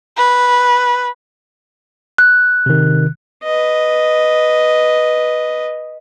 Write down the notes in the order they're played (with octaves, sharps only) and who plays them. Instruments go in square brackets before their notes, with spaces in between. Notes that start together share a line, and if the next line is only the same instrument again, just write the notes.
[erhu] B4
[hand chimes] F#6
[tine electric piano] C3 D#3
[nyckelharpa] B4 D#5